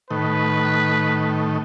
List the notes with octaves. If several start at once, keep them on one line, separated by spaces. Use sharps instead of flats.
A2 D#3 B4